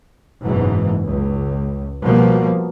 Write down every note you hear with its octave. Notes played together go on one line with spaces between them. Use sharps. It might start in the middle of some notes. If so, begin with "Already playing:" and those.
F#1 G#2 B2 E3
C#2
B2 F3 G3 A#3